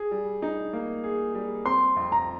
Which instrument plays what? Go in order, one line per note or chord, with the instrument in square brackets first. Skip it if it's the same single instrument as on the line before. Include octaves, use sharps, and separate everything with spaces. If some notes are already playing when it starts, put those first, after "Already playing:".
Already playing: [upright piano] G#4
G3
D#4
A#3
G#4
G3
[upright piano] C4 [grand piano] C6
[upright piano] F2
[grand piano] A#5